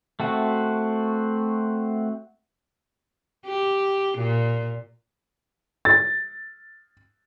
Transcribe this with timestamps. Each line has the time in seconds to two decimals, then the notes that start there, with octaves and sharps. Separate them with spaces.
0.20 A3 C4 F#4
3.46 G4
4.18 A#2
5.85 A6